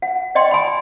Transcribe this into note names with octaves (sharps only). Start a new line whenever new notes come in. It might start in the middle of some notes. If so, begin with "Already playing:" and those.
F#5
D5 D#5 G5 C6
G#5 B5